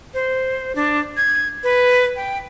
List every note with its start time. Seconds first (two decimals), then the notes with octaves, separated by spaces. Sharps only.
0.14 C5
0.75 D4
1.17 G#6
1.63 B4
2.16 G5